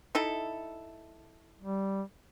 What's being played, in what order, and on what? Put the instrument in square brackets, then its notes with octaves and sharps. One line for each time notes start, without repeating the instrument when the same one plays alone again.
[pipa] D#4 E4 A4
[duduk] G3